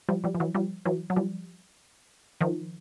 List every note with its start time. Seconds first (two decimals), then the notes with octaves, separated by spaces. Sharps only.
0.09 F3 G3
0.24 F3 G3
0.35 F3
0.40 E3 F#3
0.55 F3 G3
0.85 E3 F#3
1.10 F#3
1.16 F3 G3
2.41 D#3 F3